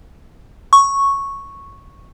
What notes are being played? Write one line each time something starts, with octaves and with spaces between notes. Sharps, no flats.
C#6